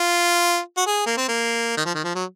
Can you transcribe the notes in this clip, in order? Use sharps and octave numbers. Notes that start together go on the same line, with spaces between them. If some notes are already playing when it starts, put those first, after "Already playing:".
Already playing: F4
F#4
G#4
A#3
C4
A#3
D#3
F3
D#3
F3
F#3